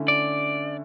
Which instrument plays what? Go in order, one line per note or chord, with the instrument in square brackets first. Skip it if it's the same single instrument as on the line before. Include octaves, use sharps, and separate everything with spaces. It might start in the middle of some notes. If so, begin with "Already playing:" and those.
Already playing: [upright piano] D3 A3 C#4 E4
[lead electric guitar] D5